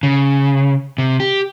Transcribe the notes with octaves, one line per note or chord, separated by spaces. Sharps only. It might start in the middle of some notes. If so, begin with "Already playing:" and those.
C#3
C3
G4